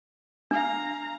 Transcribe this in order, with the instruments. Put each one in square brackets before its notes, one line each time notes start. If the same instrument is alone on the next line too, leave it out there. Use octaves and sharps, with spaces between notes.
[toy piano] D4 [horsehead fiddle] F5 A#5